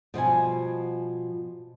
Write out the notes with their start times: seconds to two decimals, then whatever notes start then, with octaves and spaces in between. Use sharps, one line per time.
0.14 B2 F3 G3 G#5